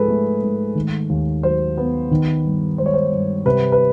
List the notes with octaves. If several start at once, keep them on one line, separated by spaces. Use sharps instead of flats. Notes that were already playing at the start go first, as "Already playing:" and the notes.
Already playing: G#2 F3 G#4 A4 B4
A3
G#2
D#3
D#2
F#3 C5
B3
D#3
G2
G#3 C5
C#5
C5
G2
C3 B4
B4